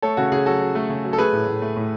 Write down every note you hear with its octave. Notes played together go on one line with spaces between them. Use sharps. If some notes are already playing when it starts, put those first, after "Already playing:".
A3 A4 C#5
C#3 F#4
C#3 G#4
F#3 F#4 A4
F#3
A3
C#3
F#3
A4
A3 G#4 B4
A2
A2
A3
A2